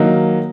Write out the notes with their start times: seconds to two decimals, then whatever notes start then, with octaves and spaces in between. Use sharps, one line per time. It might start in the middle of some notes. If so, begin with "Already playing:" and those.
Already playing: D#3 F#3 A#3 D#4